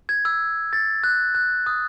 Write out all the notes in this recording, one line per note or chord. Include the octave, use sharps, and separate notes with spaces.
G#6
E6
A6
F#6
F#6
D#6